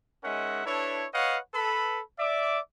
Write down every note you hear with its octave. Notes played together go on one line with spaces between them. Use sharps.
G#3 C#4 D#4 A#4 E5 F#5
D4 E4 A4 B4 C#5
B4 C#5 D#5 F5 F#5
A4 B4 B5
D5 E5 D6